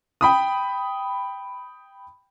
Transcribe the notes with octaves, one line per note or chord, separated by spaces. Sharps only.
G5 B5 D#6